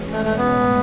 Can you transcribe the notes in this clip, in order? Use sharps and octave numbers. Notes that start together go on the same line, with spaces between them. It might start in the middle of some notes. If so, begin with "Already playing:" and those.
Already playing: E2 B2 G#3 C#4
A3
A3
B3
A2 G#3